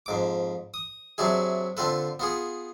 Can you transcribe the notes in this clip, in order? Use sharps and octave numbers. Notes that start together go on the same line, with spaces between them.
F2 G#2 D6
D#6
C3 F#3 D4 E4 G#4
D3 C4 F4 A4 B4
B3 F4 G#4